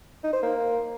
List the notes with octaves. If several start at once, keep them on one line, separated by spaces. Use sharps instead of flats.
D#4
C5
A#3